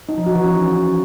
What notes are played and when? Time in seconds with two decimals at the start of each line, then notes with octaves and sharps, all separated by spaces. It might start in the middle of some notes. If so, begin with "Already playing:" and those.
0.09 D#4
0.17 F3
0.26 F#4
0.35 E3
0.44 C#4